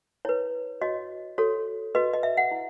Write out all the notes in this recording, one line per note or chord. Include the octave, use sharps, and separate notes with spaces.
E4 B4 C#5
F#4 C#5 D#5
F#4 A4 C#5
F#4 B4 D#5
D#5
E5
F#5
E4